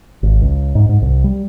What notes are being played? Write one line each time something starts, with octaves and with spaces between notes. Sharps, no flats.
G#1
C#2
G#2
G#2
C2
G3